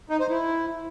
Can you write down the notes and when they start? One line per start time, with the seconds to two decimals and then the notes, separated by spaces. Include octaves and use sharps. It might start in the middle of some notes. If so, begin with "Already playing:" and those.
0.09 D#4
0.20 C5
0.30 E4